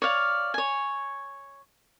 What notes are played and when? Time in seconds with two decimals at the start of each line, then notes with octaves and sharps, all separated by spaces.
0.02 C#5 D5 F5
0.54 C#5 G#5